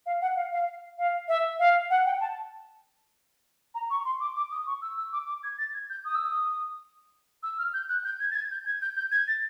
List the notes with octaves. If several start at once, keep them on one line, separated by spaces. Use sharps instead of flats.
F5
F#5
F5
F5
F5
E5
F5
F#5
G5
A5
A#5
C#6
C6
D6
D6
D#6
C#6
E6
E6
D6
D6
G#6
A6
G#6
G6
D#6
E6
D#6
E6
F6
G6
F#6
G6
G#6
A6
G#6
G6
G#6
G6
G6
G#6
A6